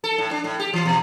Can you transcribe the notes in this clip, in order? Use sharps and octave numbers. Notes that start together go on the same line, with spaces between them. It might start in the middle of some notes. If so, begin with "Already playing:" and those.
A4
A2
D4
A2
G4
E3
B2